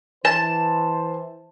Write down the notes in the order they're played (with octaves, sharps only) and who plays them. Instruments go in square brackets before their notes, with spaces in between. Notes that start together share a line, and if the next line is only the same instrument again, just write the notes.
[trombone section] E3 C5 [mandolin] A5